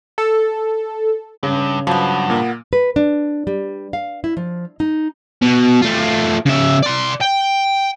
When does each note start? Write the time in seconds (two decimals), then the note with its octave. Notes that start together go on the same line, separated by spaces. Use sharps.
0.18 A4
1.43 G2 C#3
1.87 G2 F3 F#3 B3
2.30 A#2 A#3
2.73 B4
2.96 D4
3.47 G3
3.93 F5
4.24 E4
4.37 F3
4.80 D#4
5.42 B2
5.82 A3 F4
6.46 C#3 E5
6.83 D5 C6
7.21 G5